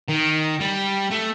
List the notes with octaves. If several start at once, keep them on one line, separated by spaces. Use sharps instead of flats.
D#3
G3
A3